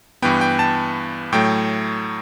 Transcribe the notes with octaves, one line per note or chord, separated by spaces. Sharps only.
G2 E3 B3 G5
G5
A5
A2 F#3 A3 G5